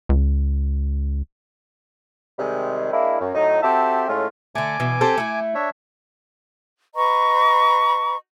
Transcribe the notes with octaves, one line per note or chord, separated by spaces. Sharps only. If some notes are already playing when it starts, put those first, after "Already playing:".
C#2
C3 D#3 G3 G#3
G#3 A#3 D4 E4
F#2
A2 F#3 D#4
C4 F#4 G4 A4 E5 A5
A2 G#3 A3 C#4 F4
D3 A3 G#5 D6
B2 E3
C4 G4 A4
A3 E4
D4 C#5 E5
B4 D#5 A#5 C#6